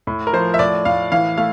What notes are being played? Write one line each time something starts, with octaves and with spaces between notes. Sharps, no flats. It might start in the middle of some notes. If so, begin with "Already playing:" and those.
A2
A#4
F3 C5
E5
A2 D5
A2 F5
E3 F5
A3 F5